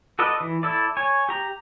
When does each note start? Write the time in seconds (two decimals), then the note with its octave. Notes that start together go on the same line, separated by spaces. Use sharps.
0.19 F#4 A4 B4 D5 D#5
0.41 E3
0.63 E4 A4 D5
0.97 C#5 G#5
1.29 G4 A#5